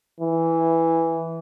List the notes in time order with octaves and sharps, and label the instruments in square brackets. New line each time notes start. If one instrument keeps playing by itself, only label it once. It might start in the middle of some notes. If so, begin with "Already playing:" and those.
[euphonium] E3